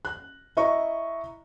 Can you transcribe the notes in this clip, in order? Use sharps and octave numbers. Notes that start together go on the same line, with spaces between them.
F#6
E4 D#5 E5 A#5 C#6